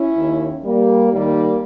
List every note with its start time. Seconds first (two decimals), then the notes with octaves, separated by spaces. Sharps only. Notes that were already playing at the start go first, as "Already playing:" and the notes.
Already playing: C#4 E4
0.16 D#2 D#3
0.64 G3 A#3
1.12 D#2 D#3 G3 A#3